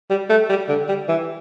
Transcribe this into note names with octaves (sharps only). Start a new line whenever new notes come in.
G3
A3
G3
D3
G3
E3